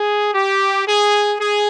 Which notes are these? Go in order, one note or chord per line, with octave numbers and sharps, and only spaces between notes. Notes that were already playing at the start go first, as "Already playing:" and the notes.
Already playing: G#4
G4
G#4
G#4